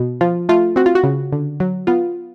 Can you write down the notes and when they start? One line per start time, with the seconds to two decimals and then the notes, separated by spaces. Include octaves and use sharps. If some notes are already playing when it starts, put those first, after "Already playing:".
Already playing: B2
0.21 F3 F4
0.49 A3 F4
0.76 C4 F#4
0.86 F4
0.95 F#4
1.04 C#3
1.32 D3
1.60 F#3
1.87 B3 F4